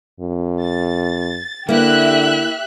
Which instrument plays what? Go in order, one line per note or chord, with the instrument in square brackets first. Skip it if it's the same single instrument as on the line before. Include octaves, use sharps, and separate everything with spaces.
[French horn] F2
[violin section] A6
[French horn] D3 [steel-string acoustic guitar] A#3 E4 [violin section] G4 E5 F#6